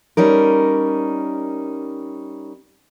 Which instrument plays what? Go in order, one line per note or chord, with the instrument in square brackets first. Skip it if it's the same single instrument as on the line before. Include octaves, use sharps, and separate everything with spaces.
[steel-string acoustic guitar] G3 C#4 D#4 A#4